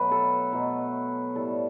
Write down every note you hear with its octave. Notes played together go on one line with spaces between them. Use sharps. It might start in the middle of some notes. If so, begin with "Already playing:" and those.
Already playing: B2 F#3 A3 B4
A4
B2 F#3 A3
A2 G3 A4